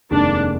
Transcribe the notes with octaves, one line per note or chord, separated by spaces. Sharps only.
F1 D#2 D#3 G#3 D4